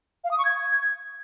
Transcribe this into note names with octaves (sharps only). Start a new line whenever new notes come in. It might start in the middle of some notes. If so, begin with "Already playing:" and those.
F5
D#6
C#6
G#6